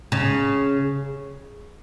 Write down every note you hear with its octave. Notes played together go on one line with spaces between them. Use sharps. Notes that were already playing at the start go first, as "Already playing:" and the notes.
C#3